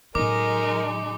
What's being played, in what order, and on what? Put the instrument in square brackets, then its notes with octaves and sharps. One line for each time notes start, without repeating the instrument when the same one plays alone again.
[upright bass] A2 C#3 [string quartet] F#3 G#3 D#4 [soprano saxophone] A#4 [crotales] D6